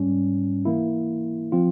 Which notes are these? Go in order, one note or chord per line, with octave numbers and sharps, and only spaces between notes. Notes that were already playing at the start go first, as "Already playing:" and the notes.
Already playing: G#2 G3 C#4
E3 A#3 E4
F3 C4 F4